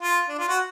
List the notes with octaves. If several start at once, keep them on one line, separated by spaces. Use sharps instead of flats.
F4
D4
F4
F#4